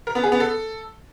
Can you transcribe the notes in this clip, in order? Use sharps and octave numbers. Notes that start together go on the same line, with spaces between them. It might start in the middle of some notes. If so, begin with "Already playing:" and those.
A#4
B3
G#4
B3
A4